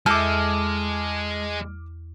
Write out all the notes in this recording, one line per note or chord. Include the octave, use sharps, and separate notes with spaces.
E2 G#3 A4 E5 D6 F6